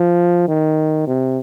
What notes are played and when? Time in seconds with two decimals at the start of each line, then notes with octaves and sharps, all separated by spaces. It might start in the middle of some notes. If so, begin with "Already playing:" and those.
Already playing: F3
0.48 D#3
1.07 C3